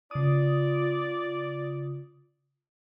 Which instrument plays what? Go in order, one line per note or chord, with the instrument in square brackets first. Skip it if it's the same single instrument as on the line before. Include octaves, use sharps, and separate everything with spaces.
[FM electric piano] C#3 D#6 [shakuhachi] F4 [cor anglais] D5